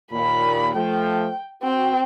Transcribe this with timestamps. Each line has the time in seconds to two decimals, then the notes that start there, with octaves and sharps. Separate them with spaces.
0.13 D#2 A#2 B5
0.75 F3 A3 G5
1.63 C4 F#4 G5